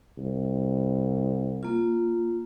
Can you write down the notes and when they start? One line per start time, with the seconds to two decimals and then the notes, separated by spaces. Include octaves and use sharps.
0.18 C2
1.63 A#3 F4